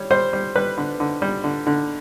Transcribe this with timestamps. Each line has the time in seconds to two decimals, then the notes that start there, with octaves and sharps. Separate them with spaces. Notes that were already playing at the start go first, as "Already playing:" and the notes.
Already playing: G3 C#5
0.10 G3 C5
0.33 G3
0.56 G3 B4
0.77 D3
1.00 D3
1.22 G3
1.44 D3
1.67 D3